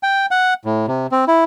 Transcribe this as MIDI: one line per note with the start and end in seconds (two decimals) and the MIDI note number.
0.03 0.26 79
0.31 0.54 78
0.65 0.86 45
0.87 1.07 48
1.12 1.25 60
1.28 1.44 64